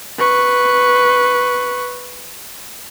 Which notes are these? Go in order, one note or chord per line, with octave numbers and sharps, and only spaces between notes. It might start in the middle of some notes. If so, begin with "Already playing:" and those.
B4 C#6